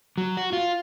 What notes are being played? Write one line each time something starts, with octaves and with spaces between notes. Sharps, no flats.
F#3
F#4
F4